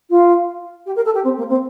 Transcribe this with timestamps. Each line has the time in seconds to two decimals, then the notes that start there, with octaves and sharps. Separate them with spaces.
0.10 F4
0.86 G4
0.96 A#4
1.05 A4
1.14 G4
1.24 C4
1.37 A#3
1.49 C4